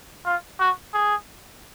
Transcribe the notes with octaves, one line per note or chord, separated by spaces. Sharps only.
F4
F#4
G#4